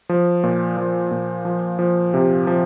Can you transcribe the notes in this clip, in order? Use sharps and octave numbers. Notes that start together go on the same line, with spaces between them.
F3
A#2
F3
A#2
F3
F3
C3
F3